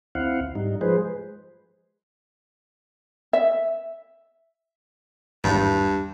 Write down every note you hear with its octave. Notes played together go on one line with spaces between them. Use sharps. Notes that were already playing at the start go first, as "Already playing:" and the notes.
D2 C4 E4 F5 F#5
G#2 G3 D#4
F3 G#3 G#4 B4 C5
E5
G#1 E2 G2